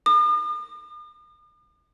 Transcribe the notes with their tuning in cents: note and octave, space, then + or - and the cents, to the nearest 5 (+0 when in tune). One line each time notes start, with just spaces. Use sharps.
D#6 -45